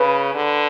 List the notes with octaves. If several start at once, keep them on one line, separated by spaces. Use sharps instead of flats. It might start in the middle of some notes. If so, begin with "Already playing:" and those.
Already playing: C#3 B4
D3